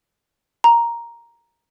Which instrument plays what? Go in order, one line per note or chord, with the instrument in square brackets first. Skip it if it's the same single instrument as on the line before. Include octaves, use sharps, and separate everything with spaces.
[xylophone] A#5